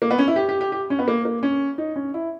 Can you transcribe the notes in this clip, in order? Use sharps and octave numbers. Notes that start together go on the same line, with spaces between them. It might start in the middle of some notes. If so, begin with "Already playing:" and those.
A#3
B3
C#4
E4
G4
G4
G4
G4
C#4
B3
A#3
A#3
C#4
D#4
C#4
E4